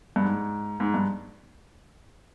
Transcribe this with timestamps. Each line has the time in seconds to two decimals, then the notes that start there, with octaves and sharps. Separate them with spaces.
0.16 G2
0.25 G#2
0.80 G#2
0.94 G2